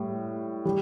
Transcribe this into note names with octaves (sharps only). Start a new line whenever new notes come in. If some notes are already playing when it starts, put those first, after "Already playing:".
Already playing: A2 G3
G3